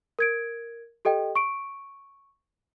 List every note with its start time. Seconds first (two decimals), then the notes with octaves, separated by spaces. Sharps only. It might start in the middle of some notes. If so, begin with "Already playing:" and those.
0.19 A#4 G#6 D7
1.05 G4 A4 D#5 G5
1.35 C#6 D7